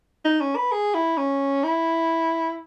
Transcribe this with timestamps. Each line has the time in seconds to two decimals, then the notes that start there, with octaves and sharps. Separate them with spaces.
0.25 D#4
0.41 C#4
0.56 B4
0.72 G#4
0.94 E4
1.17 C#4
1.64 E4